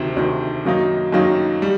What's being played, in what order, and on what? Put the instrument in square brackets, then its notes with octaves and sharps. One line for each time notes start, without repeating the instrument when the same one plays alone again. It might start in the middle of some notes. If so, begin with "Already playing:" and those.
Already playing: [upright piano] D2 C3 D#3
D2 C3 D#3
F#2 D#3 F#3 A#3 D#4
F#2 D#3 F#3 A#3 D#4
G3